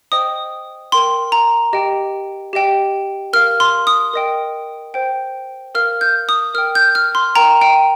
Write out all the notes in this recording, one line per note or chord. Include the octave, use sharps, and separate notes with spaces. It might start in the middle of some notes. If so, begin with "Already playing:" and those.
C5 D#5 G5 D#6
A#4 G5 C6
A#5
G4 D#5 G5
G4 D#5 G5
A#4 F5 F6
C6
D#6
A#4 D#5 G5
C5 G5
A#4 F5 F6
G6
D#6
A#4 G5 F6
G6
F6
C6
A#4 G5 A#5
G5